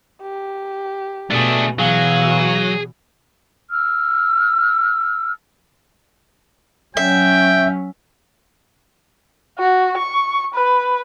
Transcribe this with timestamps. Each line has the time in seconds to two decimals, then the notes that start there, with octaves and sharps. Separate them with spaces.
0.22 G4
1.31 B2 A3 D4 G#4
1.79 B2 E3 F#3 G#4 F5
3.70 E6 F6
6.97 F#3 C#4 E5 G5
9.59 F#4
9.98 C#6
10.55 B4